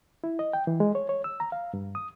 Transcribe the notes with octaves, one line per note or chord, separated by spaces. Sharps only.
E4
D#5
G5
E3
G#3
C#5
C#5
E6
A#5
F5
G2
D#6